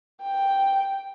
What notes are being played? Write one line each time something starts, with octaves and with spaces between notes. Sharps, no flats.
G5